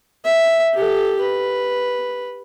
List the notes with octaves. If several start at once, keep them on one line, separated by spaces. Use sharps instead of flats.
E5
G4 A4
B4